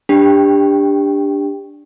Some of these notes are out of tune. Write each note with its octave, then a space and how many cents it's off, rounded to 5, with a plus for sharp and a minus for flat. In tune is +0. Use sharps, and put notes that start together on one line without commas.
D4 -5 G4 +20 G5 +0